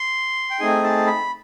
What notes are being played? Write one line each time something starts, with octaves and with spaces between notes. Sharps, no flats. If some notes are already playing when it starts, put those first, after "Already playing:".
Already playing: C6
G5
A3 C4 D#4 G#4 G#5
A5
B5